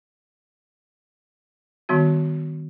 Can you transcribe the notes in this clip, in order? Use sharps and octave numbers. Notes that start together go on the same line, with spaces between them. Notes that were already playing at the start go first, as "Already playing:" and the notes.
D#3 G3 B3 F#4